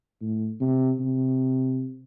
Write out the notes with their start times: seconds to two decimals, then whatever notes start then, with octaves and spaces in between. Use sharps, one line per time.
0.21 A2
0.60 C3
1.00 C3